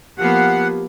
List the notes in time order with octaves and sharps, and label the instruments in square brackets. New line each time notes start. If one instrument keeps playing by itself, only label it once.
[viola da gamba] F3 A#3 B3 [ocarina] G4 [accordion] F#5